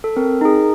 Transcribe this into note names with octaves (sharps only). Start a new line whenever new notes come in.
A4
C4 A#4
D#4 G#4